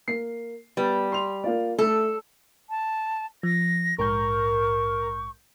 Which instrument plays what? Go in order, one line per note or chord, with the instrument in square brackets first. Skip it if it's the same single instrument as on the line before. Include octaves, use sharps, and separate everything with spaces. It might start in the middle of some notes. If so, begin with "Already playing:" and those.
[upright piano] A#3 C7
[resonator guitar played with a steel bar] G3 [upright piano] B3
[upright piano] C6 F7
A#3 F4 D5
[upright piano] A3 [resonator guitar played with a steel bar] A4
[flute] A5
[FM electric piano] F3 [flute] A#6
[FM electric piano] A#1 G#2 G6 [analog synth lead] A#4 [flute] C#6